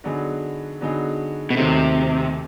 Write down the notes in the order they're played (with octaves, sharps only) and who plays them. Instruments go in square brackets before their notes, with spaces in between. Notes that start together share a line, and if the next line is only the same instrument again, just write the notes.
[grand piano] D3 F#3 B3 D#4 G#4
D3 F#3 B3 D#4 G#4
[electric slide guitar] B2
[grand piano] D#2 D#3 F#3 A3 [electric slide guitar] C3